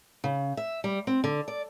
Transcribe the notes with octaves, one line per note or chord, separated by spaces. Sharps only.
C#3
E5
G3
C4
D3
D5